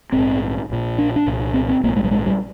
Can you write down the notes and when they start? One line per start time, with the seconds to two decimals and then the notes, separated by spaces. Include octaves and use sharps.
0.12 A#1 G#2 C4
0.70 A#1 A#2
0.98 D4
1.16 D4
1.26 C2 A#2
1.54 C4
1.69 C4
1.83 A#1 A#3
1.87 G#2
1.97 G#3
2.04 G3
2.11 G#3
2.26 G3